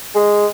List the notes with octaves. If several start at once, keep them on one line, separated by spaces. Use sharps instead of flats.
G#3